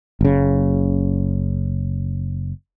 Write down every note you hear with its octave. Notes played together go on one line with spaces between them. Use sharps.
F#1 C#3